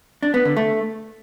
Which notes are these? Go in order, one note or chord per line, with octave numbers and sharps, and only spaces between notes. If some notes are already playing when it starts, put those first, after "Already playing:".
D4
B3
D3
A3